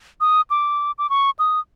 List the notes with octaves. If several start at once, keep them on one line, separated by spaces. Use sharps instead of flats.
D#6
D6
D6
C#6
D#6